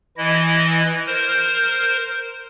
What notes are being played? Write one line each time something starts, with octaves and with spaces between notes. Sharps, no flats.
E3 E4 D#5
A#4 C5